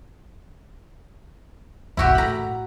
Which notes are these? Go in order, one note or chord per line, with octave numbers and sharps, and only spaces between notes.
F#1 B1 E2 E4 F#4 G4
A2 A#5 B5